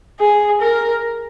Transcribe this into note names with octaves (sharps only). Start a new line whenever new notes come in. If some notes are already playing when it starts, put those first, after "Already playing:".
G#4
A#4